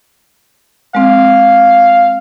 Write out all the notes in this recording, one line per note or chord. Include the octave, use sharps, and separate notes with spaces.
G#3 C4 F5